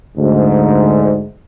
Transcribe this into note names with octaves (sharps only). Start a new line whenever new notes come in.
D2 G#2